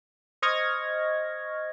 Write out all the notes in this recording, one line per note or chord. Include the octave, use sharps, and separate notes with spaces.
C5 D#5 C#6 F6 G#6 A#6